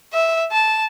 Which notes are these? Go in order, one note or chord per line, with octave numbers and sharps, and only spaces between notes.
E5
A5